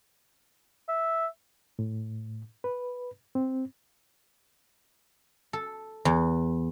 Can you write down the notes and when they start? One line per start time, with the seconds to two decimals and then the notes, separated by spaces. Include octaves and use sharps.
0.89 E5
1.79 A2
2.64 B4
3.35 C4
5.53 A4
6.05 E2